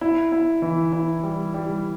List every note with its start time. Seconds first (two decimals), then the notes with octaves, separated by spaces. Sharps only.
0.01 E4
0.32 E4
0.62 E3
0.93 E4
1.23 G3
1.54 G3